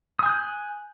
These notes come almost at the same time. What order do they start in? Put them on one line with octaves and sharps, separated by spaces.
D#6 G#5 G6 F#6